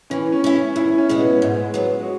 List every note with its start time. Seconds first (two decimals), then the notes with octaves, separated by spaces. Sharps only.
0.10 E3 C#4
0.32 C#4
0.44 C#4 E4
0.76 E2 E4
0.98 C#4
1.09 B2 G#3 C#4 F#4
1.19 B3
1.41 G#2 B3
1.64 G#3
1.74 F#3 B3
2.01 F#4